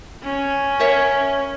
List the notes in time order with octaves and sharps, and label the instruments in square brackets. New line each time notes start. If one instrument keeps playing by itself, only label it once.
[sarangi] C#4
[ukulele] A#4 C#5 E5